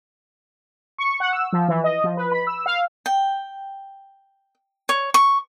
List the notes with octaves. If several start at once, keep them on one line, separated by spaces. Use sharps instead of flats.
C#6
F#5
E6
F3
E3
D#5
F3
B4
B5
E6
F5
G5
C#5
C#6